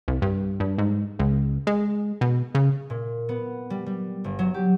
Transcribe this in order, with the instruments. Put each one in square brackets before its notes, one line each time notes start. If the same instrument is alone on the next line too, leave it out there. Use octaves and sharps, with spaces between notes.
[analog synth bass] C2
G2
G2
G#2
C#2
G#3
B2
C#3
[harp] A#2
B3
G3
G3
G1
F#3
G4